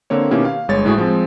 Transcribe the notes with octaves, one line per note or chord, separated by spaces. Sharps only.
D3 A#3 C4 C#5
B2 D#3 A#3 C#4 E4 G4
F5
G1 G#3 C#5 A6
A2 G#3 A3 E4 F#4 G#4
F3 G#3 C4